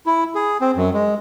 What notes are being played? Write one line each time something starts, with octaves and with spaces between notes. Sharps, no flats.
E4
G#4
C4
F#2
G#3